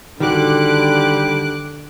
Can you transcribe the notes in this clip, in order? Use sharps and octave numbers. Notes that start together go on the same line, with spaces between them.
D3 D#3 G3 F#4 D6 F#6 D7